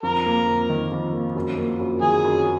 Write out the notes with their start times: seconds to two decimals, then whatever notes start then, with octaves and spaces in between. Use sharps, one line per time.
0.03 F2 A#4
0.26 A#3
0.47 F2
0.69 D#3
0.91 F2
1.13 A#3
1.35 F#2
1.57 A#3
1.80 F#2
2.02 D#3 G#4
2.24 F#2